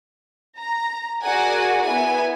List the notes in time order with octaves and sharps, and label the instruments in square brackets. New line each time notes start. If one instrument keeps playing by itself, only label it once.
[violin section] A#5
F#4 G#4 A#4 D5 F#5 G#5
B3 E4 G#5